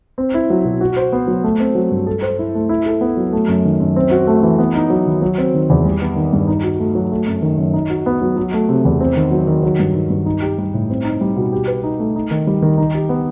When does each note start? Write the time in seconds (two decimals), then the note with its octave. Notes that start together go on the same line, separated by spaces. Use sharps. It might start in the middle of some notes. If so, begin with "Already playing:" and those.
0.18 C4
0.34 E4
0.50 F#3
0.65 B2
0.81 F#4
0.96 C5
1.13 B3
1.28 F#3
1.44 A3
1.60 C4
1.75 F#3
1.91 G2
2.07 A4
2.22 C5
2.39 E4
2.55 A3
2.69 E4
2.86 A4
3.01 B3
3.17 F#3
3.32 A3
3.48 F#2
3.65 D#3
3.80 F#2
3.96 C4
4.11 F#4
4.27 A3
4.43 E3
4.59 B3
4.75 D#4
4.90 F#3
5.06 D#3
5.22 F#3
5.38 C4
5.54 D#3
5.70 E2
5.85 G3
6.01 B3
6.16 D#3
6.33 G2
6.48 D#4
6.63 F#4
6.79 A3
6.95 F#3
7.11 A3
7.27 F#2
7.42 D#3
7.58 F#2
7.73 D#4
7.90 F#4
8.06 B3
8.22 F#3
8.37 F#3
8.53 A3
8.69 C3
8.85 E2
9.01 C4
9.16 D#3
9.31 F#3
9.47 D#3
9.63 F#3
9.79 G2
9.95 D#3
10.10 G2
10.26 D#4
10.42 G4
10.58 G3
10.74 A2
10.90 C4
11.04 D#4
11.21 G3
11.36 B2
11.53 G4
11.67 B4
11.83 D#4
11.99 A3
12.16 D#4
12.31 D#3
12.47 G3
12.62 D#3
12.78 D#4
12.95 G4
13.09 B3